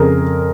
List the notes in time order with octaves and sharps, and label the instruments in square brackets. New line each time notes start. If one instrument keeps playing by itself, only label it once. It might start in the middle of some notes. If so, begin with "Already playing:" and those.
Already playing: [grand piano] F2 C#3 G#4 A#4